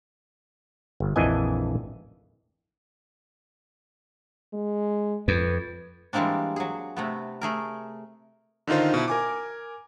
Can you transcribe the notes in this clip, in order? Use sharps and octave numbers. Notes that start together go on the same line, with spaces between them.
G1
A#1 F2 E3 D4 D#5 G#5
G#3
F2 B4
E3 G3 G#3 A#3 C4 D4
F#3 G#4
C3 A3 B3
A3 G#4 A#4
D3 D#3 D#4 F4 C5
B2 E4
A#4 G#5 D6